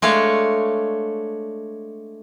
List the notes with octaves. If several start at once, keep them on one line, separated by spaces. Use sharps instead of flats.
G#3 A3 D4 C#5 F5